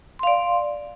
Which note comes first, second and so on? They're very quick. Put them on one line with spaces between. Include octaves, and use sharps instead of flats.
C6 F5 D5